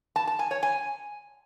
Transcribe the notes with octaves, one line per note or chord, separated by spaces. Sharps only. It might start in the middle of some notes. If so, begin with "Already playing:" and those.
A5
A5
G#5
C#5
G#5